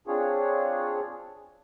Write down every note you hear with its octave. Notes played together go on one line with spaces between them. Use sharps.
C4 D4 F4 G#4 C#5